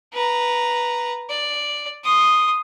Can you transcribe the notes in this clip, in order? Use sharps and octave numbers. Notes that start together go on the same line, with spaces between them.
B4 A#5
D5
C6 D#6